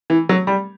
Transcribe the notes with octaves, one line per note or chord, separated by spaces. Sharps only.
E3
F#3
G3